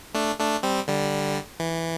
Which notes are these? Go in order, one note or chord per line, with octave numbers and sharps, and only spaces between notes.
A3 D4
A3 D4
G3 C4
D3 G3
E3